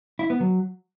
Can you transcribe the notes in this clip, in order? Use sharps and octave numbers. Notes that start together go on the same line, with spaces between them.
E4
B3
F#3